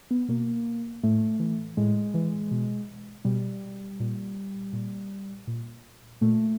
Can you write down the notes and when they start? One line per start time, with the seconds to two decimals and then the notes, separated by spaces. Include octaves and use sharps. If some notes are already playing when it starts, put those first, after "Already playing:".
0.11 B3
0.28 B2 A#3
1.03 A2 A3
1.40 E3
1.77 A2 G#3
2.14 E3
2.51 B2
3.25 B2 G3
4.00 A#2
4.73 A#2
5.47 A#2
6.21 A#2 A3